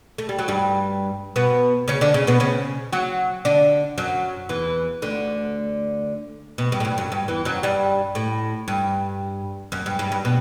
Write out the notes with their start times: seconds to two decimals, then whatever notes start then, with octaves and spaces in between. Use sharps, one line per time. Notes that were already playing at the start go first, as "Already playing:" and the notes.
0.18 A3
0.29 G3
0.39 F#3
0.48 G2 G3
1.36 B2 B3
1.88 C#3 C#4
2.01 D3 D4
2.14 C#3 C#4
2.27 B2 B3
2.40 C#3 C#4
2.93 F#3 F#4
3.45 D3 D4
3.98 F#2 F#3
4.49 E2 E3
5.02 D2 D3
6.58 B2
6.72 G2
6.80 A2
6.85 G2
6.98 F#2
7.12 G2
7.28 E2 E3
7.45 F#2 F#3
7.63 G2 G3
8.15 A2
8.68 G2
9.72 F#2
9.86 G2
9.99 G2
10.12 G2
10.25 B2